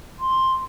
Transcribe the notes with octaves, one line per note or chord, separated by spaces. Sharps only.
C6